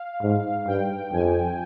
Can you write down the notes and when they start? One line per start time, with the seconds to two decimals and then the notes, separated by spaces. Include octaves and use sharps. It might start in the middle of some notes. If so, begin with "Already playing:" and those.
Already playing: F5
0.22 G#2
0.67 G2 G5
1.13 F2 G#5